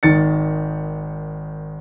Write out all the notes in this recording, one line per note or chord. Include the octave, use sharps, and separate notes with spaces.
G#1 D#3 A6 C#7